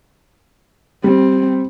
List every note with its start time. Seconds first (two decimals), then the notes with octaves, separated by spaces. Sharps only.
1.04 G3 C4